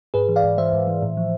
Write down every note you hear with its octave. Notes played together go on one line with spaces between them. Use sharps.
G#2 G#4 B4
E3
D5 F5
G#2
E3 C5 E5
G#2
E3
A2
F3